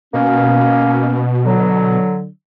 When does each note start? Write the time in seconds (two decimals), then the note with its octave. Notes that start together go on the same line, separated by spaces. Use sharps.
0.14 B2 A#3 C#4
1.44 D3 F#3